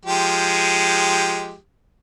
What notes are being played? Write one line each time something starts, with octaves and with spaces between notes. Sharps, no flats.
F3 G#3 G4